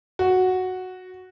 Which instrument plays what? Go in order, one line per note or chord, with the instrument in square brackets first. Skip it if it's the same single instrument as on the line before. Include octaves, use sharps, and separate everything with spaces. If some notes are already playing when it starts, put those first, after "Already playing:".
[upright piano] F#4